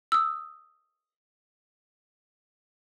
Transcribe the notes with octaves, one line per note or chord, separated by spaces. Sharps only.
D#6 E6